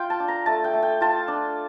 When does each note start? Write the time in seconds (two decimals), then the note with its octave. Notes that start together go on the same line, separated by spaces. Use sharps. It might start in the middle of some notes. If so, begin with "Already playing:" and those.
Already playing: F4 G5
0.10 A5
0.20 D4
0.28 A#5
0.46 A3 A5
0.64 G5
0.74 A3
0.82 G5
1.01 F4 A5
1.28 D4